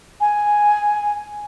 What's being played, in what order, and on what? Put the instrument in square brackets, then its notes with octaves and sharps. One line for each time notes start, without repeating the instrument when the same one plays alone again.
[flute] G#5